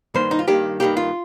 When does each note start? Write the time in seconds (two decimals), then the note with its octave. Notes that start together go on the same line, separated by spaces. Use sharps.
0.14 G2 D#3 A#3 C5
0.31 D#4
0.39 F4
0.48 G2 D#3 A#3 G4
0.80 G2 D#3 A#3 G4
0.97 F4